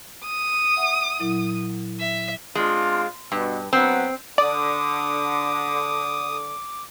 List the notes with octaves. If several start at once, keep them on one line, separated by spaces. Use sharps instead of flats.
D#6
E5 F#5
A#2 F#3 E4
E5
G#3 C4 D4 F4
G2 B2
F#3 B3 C4
D3 D5 D6 D#6